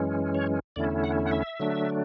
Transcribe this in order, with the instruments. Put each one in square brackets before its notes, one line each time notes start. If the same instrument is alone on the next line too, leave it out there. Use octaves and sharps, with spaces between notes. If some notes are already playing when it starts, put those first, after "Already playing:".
Already playing: [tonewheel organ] F#2 E3 G#3 C#4
C#5
E2 D3 A3 C#4 E4 D5
F#5
F#5
E5
D3 F#3 A3 D4